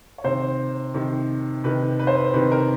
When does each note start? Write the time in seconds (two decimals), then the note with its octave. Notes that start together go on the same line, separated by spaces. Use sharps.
0.18 C#5
0.24 C3 D#3 C5
0.94 C3 D#3
1.64 C3 D#3 B4
1.99 B4
2.07 C5
2.15 B4
2.34 C3 D#3 B4
2.51 A#4